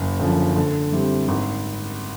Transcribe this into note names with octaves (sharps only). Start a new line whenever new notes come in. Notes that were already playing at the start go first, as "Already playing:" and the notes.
Already playing: F#1
F#2 D3 F3
D3
G3 C4 E4 G4
G#1